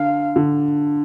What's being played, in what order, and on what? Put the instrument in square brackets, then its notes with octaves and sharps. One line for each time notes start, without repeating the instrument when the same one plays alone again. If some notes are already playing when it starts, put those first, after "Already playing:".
Already playing: [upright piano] D3 [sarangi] F5
[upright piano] D3